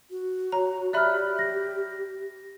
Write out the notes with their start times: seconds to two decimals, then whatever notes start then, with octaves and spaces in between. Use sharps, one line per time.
0.10 F#4
0.52 C#5 A#5
0.93 G4 D5 E5 B5 F6 F#6
1.39 A#6